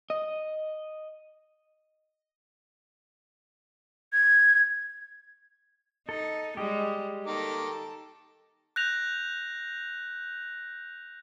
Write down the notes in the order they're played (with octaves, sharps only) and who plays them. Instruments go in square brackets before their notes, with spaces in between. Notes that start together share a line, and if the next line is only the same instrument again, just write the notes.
[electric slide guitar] D#5
[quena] G#6
[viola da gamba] D#4 [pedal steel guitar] A4
[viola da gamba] G3 G#3 [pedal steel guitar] G4 D#5
[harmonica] D#3 A#5 D6 [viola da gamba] A4
[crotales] F#6 G6 A#6 F7